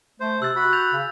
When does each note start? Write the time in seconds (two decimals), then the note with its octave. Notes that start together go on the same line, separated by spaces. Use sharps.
0.20 A3 C5
0.42 C3 E6 F#6 A6
0.56 F#4 B5 F#6
0.73 G6 A6 F7
0.93 C#3